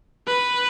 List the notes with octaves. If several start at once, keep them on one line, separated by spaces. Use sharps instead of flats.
B4